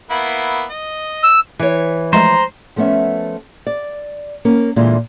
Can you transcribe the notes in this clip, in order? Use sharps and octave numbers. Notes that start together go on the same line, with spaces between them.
A#3 B3 E4
D#5
E6
E3 C#5
F3 G#3 A3 C5 A#5
F3 A3 B3 C#4 E5
D5
A#3 C#4 A#4
A#2 D3 E3 G#3 E4 F4